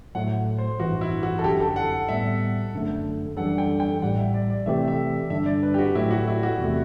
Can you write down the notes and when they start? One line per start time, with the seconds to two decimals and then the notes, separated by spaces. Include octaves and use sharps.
0.15 A2 F#3 A3 F#5
0.58 C5
0.80 A1 G2 E3 F#4
1.01 E4
1.23 F#4
1.39 A4
1.44 G1 F#2 D3 G4
1.60 A4
1.76 F#5
2.09 A2 G3 B3 E5
2.73 G1 F#2 D3 A3
3.37 F#2 E3 G3 D4 A4 F#5
3.58 G5
3.80 G5
4.01 A1 A2 G3 F#5
4.18 E5
4.34 D5
4.50 D5
4.66 C3 E3 A3 C4 G4 E5
4.88 E5
5.30 G2 D3 G3 D4 E5
5.46 D5
5.63 B4
5.74 G4
5.79 F#4
5.95 A2 F#3 A3 E4
6.11 F#4
6.28 E4
6.43 F#4
6.59 E2 C3 E3 A3